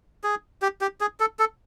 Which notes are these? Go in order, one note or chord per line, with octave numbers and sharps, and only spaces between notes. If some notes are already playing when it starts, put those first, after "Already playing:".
G#4
G4
G4
G#4
A4
A4